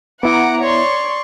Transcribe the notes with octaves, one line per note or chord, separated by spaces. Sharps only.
B3 E4 E5 F#5 A#5 D6
C#5 D5 C6 C#6